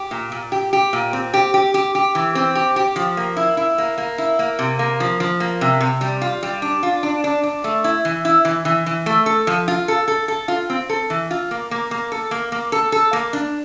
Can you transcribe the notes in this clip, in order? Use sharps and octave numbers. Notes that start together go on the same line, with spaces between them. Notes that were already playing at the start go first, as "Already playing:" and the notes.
Already playing: G4
A#2
A#2
G4
G4
A#2
C4
G4
G4
G4
G4
E3
C4
G4
G4
F3
A#3
E4
E4
A#3
A#3
E4
A#3
C3
A#3
F3
F3
A#3
C3
C3
G3
F4
G3
D4
F4
D4
D4
D4
A3
E4
E3
E4
E3
E3
E3
A3
A4
F3
F4
A4
A4
A4
F4
C4
A4
E3
F4
A#3
A#3
A#3
A4
A#3
A#3
A4
A4
A#3
D4